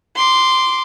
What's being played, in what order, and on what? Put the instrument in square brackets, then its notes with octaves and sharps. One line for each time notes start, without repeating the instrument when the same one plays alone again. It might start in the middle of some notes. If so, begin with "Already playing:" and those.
[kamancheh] C6 D6